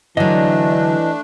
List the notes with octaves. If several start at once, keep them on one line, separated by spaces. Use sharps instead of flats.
D3 E3 F#3 A3 D4 D#5